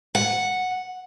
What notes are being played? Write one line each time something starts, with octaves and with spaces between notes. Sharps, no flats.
F#5